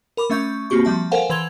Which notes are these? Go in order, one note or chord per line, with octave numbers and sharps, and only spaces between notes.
A#4 B5 D6
A3 C#4 E5 C#6 G6
A#3 C4 F#4 G4 C#6
F3 G3 E5 A5
A4 A#4 C5 F5 F#5 G#5
E3 B4 C6 G#6 F7 G7